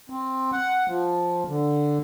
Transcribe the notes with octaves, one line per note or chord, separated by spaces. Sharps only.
C4
F#5
F3
D3